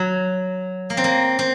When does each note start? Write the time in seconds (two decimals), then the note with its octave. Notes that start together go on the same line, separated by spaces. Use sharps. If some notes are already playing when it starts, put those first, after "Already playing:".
Already playing: F#3
0.90 A#3
0.97 C4
1.04 A#3
1.39 C4